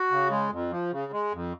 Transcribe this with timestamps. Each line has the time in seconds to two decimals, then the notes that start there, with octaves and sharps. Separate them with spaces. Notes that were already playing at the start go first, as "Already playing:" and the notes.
Already playing: F#4
0.11 C#3
0.31 G#3
0.52 F2
0.71 F3
0.92 C#3
1.13 G#3
1.33 F2